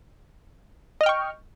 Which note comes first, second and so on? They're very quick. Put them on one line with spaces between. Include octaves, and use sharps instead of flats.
D#5 F6 G5 C#6